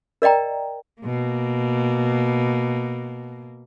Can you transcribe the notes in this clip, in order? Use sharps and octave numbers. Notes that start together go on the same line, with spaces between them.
A#4 D5 D#5 G5 A#5
B2 A#3